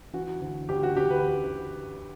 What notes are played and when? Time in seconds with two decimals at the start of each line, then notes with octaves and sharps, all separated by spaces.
0.13 E3 F#4
0.41 D2
0.69 D2 G4
0.83 F#4
0.97 D2 G4
1.11 B4